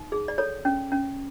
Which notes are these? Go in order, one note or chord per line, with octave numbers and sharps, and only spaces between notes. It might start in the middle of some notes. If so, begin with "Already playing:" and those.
Already playing: D#4
G#4
D5
A4 C#5
C#4
C#4